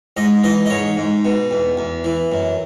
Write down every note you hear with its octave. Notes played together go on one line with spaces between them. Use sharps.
G#2 D#5
E3 D#5
D#5
G#2 C#5
G#2
B2
E2
E2
E3
F#2